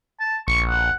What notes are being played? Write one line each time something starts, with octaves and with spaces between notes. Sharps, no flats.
A5
A#1 C#6
F#5